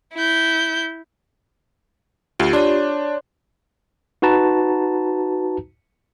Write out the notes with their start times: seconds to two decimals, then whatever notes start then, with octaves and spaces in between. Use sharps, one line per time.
0.15 E4 G6
2.40 D2 F4 G4
2.53 D4 C#5 D5 C6
4.22 D#4 F#4 B4 A5 A#5